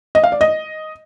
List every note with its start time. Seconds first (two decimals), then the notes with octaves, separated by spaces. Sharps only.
0.15 D#5
0.24 F5
0.32 D5
0.41 D#5